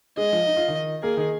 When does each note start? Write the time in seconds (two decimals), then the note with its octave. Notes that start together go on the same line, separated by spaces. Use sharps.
0.17 G#3 G#4 D#5
0.32 F3 F4
0.46 D#4
0.57 F4
0.68 D#3 D#4
1.03 A#3 G#4 A#4
1.17 D#3 D#4